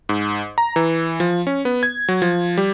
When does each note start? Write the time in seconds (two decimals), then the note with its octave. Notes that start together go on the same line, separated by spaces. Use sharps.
0.09 G#2
0.58 A#5
0.76 E3
1.20 F3
1.47 C#4
1.65 B3
1.83 G#6
2.08 F#3
2.22 F3
2.57 G3